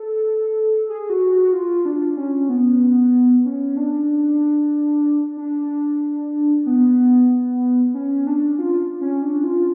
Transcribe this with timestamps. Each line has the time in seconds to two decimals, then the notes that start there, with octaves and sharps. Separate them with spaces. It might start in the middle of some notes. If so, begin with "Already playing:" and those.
Already playing: A4
0.89 G#4
1.10 F#4
1.32 F#4
1.43 F#4
1.53 F4
1.85 D4
2.17 C#4
2.49 B3
3.46 C#4
3.77 D4
5.37 D4
6.66 B3
7.94 C#4
8.26 D4
8.59 F4
9.01 C#4
9.22 D4
9.44 F4